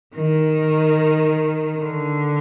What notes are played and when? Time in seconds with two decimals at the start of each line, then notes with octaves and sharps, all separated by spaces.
0.15 D#3
1.80 D3